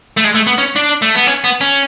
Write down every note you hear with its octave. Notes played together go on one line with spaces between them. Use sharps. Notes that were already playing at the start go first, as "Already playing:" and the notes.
A3
G#3
A3
B3
C#4
D4
A3
B3
C#4
B3
C#4